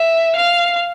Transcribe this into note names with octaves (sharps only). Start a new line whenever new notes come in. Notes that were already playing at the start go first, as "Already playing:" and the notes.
Already playing: E5
F5